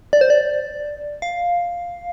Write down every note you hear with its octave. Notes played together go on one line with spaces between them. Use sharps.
D5
C5
D5
F5